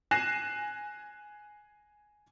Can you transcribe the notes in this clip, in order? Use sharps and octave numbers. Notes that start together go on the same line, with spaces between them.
G#5 F#6 A#6 C7 E7